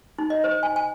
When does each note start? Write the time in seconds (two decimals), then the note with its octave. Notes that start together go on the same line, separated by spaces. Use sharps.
0.19 D#4
0.30 D#5
0.44 C5
0.63 G#5
0.76 G#5